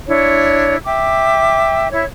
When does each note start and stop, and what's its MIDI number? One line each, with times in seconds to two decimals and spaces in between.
0.07 0.76 62
0.07 0.76 64
0.07 0.76 73
0.84 1.88 76
0.84 1.88 79
0.84 1.88 86
1.92 2.04 64
1.92 2.04 73